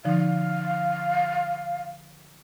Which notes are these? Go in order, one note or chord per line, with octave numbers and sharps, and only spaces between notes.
D3 F3 D#4 F5